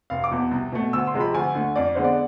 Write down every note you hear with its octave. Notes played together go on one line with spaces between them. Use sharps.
F1 F5
D6
E2 B2
C2
B2 A3
D2 E6
C6
C3 F3 G#3
B5
D2 G#5
D3 A3
F2 D5
D3 G#3 B3 C5
D5